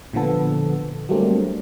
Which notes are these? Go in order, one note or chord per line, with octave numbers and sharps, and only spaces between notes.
A#2 D3 F3 B3 A4
F#3 G3 A3 A#3 C4 D4